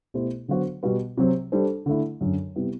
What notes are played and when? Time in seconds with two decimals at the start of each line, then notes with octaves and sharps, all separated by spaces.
0.14 B2 A3 E4 G4 C5
0.48 D3 F#3 B3 F#4 C5
0.83 B2 G3 B3 F#4 B4
1.17 C3 F#3 C4
1.52 G3 D4 A4 C5
1.86 D3 A3 E4
2.21 F#2 D3 F#3
2.56 C3 G3 B3 E4